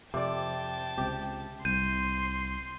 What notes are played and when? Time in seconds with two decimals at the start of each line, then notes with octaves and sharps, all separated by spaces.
0.14 F2 C3 D5 G5 A5
0.98 C#2 C3 G4
1.65 C2 C6 G6 D#7